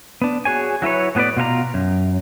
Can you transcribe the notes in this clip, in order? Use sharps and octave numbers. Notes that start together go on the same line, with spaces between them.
B3 D4
F#4 G#4 C#5 G#5
F#3 E4 B4 C#5
A2 B3 G#4 B4 D5
B2 F4 A#4 A#5
F#2